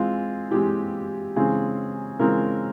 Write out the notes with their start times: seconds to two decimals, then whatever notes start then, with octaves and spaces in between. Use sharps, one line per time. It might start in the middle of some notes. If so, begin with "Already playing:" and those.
Already playing: E3 G#3 C4 F4
0.51 E3 G#3 C4 G4
1.36 C#3 E3 G#3 C4 G#4
2.20 C#3 E3 G#3 C4 A#4